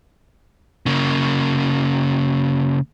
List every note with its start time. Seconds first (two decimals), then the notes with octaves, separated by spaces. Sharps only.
0.86 C#3 A#3